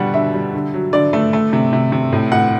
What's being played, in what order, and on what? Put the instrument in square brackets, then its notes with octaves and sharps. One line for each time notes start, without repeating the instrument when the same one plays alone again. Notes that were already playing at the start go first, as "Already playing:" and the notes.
Already playing: [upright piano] B2 D3 G3 F#5
D3 E5
G3
D3
F#3
D3 D5
A3
A3
C3
C3
C3
A2
A2 F#5